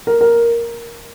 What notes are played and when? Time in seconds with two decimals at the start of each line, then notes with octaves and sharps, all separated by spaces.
0.07 A#4
0.21 A#4